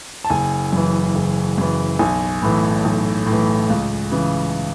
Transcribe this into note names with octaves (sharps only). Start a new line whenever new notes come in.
A5
F#1 G#5
F#2 E3
F#1
F#2 E3
B1 G#5
A2 E3
B1
A2
E3
C#2
C#3 E3